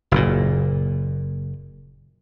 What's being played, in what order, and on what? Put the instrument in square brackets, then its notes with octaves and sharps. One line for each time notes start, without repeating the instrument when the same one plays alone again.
[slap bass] F#1 A#2